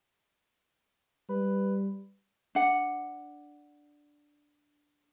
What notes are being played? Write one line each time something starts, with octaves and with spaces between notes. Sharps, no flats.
G3 B4
D4 F#5